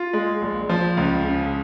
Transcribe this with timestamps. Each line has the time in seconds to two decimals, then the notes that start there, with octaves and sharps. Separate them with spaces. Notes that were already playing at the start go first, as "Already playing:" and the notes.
Already playing: F4
0.13 G#3
0.42 A#1
0.69 F3
0.97 C#2
1.24 C#3